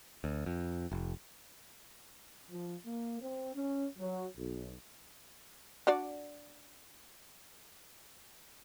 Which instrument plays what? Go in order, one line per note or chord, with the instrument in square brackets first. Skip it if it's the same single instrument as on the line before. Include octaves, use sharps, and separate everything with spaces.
[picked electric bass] D2
F2
F1
[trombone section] F3
A#3
C4
C#4
F#3
B1
[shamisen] D4 F#4 D5